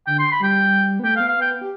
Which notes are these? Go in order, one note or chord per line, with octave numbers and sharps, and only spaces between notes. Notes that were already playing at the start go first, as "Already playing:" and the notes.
D3 G5
C6
B5
G3 G5
B3
A3 G5
F5
B3
F5
B3 G5
G4